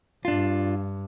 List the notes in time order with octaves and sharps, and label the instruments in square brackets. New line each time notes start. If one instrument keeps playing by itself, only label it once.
[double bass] G2 [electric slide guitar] D4 F4